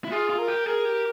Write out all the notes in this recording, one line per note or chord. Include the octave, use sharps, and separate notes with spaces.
E4
F4 G#4
F4
A#4
G4
G#4 A#4
G4